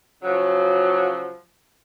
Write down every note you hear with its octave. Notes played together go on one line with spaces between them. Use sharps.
C#3 F3 F#3